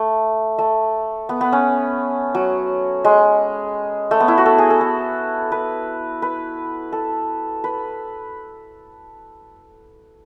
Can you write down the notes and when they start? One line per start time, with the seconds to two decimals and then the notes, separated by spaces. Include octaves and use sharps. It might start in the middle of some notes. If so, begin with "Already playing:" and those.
Already playing: A3
0.58 A3
1.29 B3
1.41 B3
1.52 C#4
2.35 F#3
3.05 G#3
4.11 A3
4.20 B3
4.28 E4
4.38 F#4
4.46 A4
4.58 G#4
4.70 A4
4.81 A4
5.52 B4
6.22 B4
6.92 A4
7.64 B4